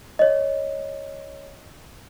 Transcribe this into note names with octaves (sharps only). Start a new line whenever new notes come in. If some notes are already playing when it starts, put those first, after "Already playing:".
C#5 D#5